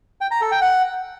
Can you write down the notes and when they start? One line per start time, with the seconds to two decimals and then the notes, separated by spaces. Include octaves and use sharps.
0.21 G5
0.31 A#5
0.41 A4
0.51 G5
0.61 F#5